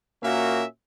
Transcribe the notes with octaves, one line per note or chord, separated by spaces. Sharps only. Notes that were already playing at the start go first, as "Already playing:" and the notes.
A#2 A#3 C#4 F#4 A#4 E5